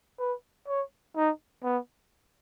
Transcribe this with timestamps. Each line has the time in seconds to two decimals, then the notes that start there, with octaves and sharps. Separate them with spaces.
0.19 B4
0.68 C#5
1.16 D#4
1.63 B3